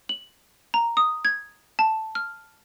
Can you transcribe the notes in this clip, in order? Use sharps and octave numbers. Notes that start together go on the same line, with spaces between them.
F#7
A#5
D#6
G#6
A5
F6